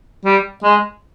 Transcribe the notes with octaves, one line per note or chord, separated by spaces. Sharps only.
G3
G#3